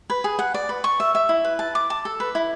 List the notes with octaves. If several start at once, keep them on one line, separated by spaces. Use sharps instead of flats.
B4
G#4
F#5
D5
B4
C#6
E5
E5
E4
B4
A5
D6
A5
A4
B4
E4